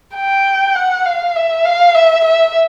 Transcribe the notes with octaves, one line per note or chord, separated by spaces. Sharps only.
G5
F#5
F5
E5
F5
E5
E5